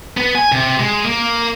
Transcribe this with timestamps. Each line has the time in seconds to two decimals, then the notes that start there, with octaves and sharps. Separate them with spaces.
0.17 B3
0.35 G#5
0.52 C3
0.79 G#3
1.05 A#3